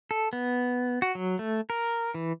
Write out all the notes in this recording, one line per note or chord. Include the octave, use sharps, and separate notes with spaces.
A4
B3
F#4
F#3
A3
A#4
E3